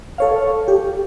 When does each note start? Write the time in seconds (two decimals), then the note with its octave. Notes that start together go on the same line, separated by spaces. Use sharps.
0.18 A4 C#5 F5
0.68 G4